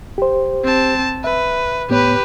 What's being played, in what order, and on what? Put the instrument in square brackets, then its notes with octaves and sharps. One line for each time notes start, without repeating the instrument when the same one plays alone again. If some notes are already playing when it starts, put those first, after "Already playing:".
[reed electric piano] G4 C5
[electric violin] C4 A5
[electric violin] B4 [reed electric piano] E5
[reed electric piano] A2 B3 C#5 [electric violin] G4 B4